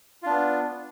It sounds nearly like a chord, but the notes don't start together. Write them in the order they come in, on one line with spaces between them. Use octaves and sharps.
F4 D4 B3